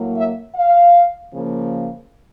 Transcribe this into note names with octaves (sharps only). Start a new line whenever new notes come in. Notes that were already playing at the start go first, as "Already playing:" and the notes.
Already playing: A2 F#3 A#3
E5
F5
C#3 F3 A#3